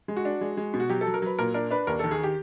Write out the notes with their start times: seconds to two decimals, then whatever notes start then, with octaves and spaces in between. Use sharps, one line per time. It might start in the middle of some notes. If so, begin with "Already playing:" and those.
0.08 G#3
0.16 F#4
0.25 D4
0.41 G#3
0.57 G#3
0.74 B2
0.80 F#4
0.89 F#3 G4
1.01 A4
1.06 F#3
1.14 A#4
1.22 F#3 B4
1.39 A#2 A#4
1.54 D4 A#4
1.71 D4 B4
1.87 D#2 A#4
1.99 D#3 A4
2.11 G#4
2.23 G4